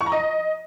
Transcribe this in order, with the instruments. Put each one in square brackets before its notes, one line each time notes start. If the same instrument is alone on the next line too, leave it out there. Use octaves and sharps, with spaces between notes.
[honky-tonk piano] C#6
A#5
D#5